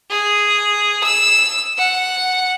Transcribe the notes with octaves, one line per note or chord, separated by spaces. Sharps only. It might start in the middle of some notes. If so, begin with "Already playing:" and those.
G#4
E6
F#5